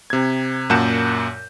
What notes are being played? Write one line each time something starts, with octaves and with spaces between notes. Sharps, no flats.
C3 G#6
F#2 A#2 F#5 A5 G6 E7